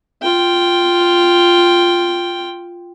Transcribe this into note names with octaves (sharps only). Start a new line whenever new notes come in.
F4 G5